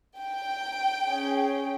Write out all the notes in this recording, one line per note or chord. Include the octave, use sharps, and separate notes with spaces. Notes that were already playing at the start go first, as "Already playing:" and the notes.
G5
C#4 G#4